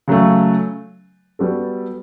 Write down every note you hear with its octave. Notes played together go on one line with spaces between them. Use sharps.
C#3 F#3 A3
G3 B3 F#4 A4